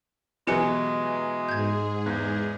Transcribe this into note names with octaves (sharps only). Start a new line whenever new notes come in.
B2 E3 F#3 G#3 G4 G#5 C#7
G#2 G#4 G6 G#6
E2